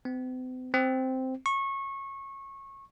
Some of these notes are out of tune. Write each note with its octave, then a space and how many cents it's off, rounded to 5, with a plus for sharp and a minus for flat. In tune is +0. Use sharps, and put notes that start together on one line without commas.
C4 -45
C4 -5
C#6 -20